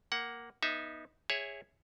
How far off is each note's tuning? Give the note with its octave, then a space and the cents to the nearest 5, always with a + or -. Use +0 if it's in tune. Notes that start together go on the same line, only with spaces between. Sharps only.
A#3 +0 F#5 +15
B3 -25 D#4 +0 E5 +0
G#4 -15 C#5 +0 E5 +0